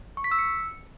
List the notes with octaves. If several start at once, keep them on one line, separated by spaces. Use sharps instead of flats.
C#6
B6
E6
C#7